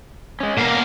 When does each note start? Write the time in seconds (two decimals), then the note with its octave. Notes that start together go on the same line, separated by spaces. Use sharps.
0.40 G#3 C#4
0.57 B2 A#3 A#4 F5